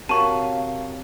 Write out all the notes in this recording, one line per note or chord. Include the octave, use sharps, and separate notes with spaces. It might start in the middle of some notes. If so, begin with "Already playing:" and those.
C3 F#4 A#4 C#5 F5 A5 C#6 D#7